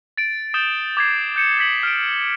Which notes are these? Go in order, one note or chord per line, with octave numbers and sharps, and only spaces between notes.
A6 D7
D#6 G6 A6 E7 G7
D6 G#6 C7
G6 C#7 E7
G6 G#6 B6 F#7
F6 D7